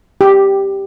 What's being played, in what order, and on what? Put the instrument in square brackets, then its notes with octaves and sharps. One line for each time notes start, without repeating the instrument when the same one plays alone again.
[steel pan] G4